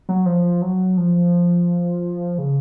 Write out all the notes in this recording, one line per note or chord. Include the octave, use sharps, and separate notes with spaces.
F#3
F3
F#3
F3
C#3